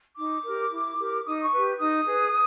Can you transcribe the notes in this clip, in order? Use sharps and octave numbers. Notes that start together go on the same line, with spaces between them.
D#4 D6
G4 A#4
E4
G4 A#4
D#4 D#6
C#6
G4 B4
D#4 D#6
G#4 B4